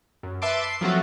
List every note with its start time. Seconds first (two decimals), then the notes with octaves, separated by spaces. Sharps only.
0.23 F#2
0.42 B4 E5 A5 C6 D6
0.64 C7
0.81 F3 F#3 A3 C4 F#4 A4